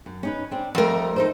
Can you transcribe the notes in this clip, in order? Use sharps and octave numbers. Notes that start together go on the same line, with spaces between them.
F#2
C#4 D#4 B4
C4 D4
F2 G3 A3 A#4
D#4 A4 C5